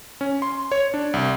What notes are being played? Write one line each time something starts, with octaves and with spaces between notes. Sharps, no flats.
C#4
C6
C#5
D4
C2